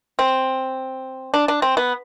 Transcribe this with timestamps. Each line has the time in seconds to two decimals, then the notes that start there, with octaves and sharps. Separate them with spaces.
0.19 C4
1.34 D4
1.48 D4
1.62 C4
1.77 B3